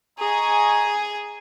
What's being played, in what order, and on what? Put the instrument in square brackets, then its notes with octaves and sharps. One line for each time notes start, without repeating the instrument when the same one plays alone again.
[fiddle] G#4 G#5 [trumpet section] D#5 A#5 C#6